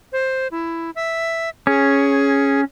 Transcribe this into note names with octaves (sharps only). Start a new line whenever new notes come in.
C5
E4
E5
C#4 G#4